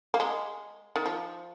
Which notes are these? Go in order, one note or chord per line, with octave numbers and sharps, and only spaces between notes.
A#3
G#3
D#3
F3